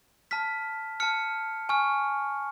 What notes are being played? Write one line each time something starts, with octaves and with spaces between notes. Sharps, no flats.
A5 F6 B6
A5 F6 C#7
G#5 C#6 F6